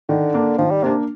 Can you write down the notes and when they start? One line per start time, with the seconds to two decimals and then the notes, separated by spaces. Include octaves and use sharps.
0.09 D3 D#3
0.34 A#3 D4
0.58 D#3 F3
0.71 G3
0.83 C3 A#3 D4